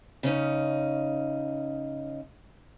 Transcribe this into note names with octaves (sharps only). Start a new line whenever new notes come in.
C#3 C#4 D#4